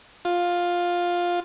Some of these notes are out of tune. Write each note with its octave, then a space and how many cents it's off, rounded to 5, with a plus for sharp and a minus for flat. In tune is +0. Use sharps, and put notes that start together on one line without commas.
F4 +10